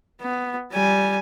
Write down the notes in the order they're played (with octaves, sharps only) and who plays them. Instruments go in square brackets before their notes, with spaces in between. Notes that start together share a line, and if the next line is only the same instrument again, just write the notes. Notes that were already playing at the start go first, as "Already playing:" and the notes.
[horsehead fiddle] B3
G3 G#5